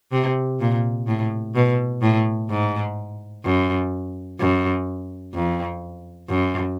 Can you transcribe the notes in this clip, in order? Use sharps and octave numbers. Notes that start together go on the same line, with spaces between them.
C3
A#2
A2
B2
A2
G#2
F#2
F#2
F2
F#2